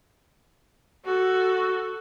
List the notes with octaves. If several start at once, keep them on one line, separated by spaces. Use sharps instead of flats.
F#4 A4